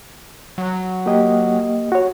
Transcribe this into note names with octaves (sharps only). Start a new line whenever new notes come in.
F#3
A#3 G4 D#5
F#4 C#5